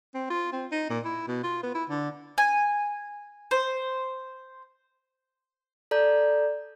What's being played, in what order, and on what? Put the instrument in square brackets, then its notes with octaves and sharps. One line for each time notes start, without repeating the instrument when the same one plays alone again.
[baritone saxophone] C4
F4
C4
D#4
A#2
E4
B2
F4
B3
E4
D3
[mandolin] G#5
C5
[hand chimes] A4 D5 A#5 G6